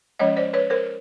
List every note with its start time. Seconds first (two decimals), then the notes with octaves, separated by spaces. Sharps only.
0.19 F3 G#3 C#4 C#5 D#5
0.37 C5 D5
0.53 B4 C#5
0.70 A#4 C5